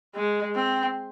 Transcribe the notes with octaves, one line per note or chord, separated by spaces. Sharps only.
G#3
C4